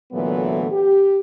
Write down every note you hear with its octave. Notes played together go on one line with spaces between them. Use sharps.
A#2 D3 E3 F#3 A3 B3
G4